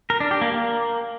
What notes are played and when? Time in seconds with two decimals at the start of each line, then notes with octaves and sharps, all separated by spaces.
0.10 A#4
0.20 D4
0.31 G4
0.41 A#3
0.52 A#3